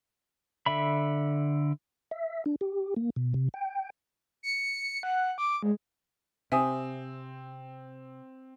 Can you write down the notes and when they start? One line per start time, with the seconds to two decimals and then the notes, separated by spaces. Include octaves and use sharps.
0.66 D3 E5 B5
2.11 E5
2.46 D4
2.61 G4
2.96 A#3
3.16 B2
3.34 C3
3.54 G5
4.43 C#7
5.03 F#5
5.38 D6
5.63 G#3
6.52 C3 C4 E5 G#5 D#6